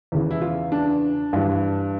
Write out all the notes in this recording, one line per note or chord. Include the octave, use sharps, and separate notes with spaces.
E2 C#3 E3
E4
F4
D4
G2 E3